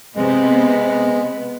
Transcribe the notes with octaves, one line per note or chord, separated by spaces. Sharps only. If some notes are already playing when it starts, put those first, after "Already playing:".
C3 G#3 B3 C4